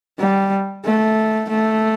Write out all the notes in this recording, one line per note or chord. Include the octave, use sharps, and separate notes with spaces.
G3
A3
A3